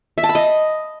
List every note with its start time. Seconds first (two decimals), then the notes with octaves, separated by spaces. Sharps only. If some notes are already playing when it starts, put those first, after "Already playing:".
0.18 E5
0.23 A5
0.29 B5
0.35 D#5